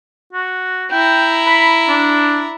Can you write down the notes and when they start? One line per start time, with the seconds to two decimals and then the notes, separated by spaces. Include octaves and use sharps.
0.33 F#4
0.91 E4 G5 A#5
1.46 B5
1.88 D4